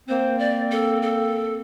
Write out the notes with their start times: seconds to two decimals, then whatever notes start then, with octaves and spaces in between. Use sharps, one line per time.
0.09 A#3 C4 C5
0.39 D5
0.72 A4
1.02 A4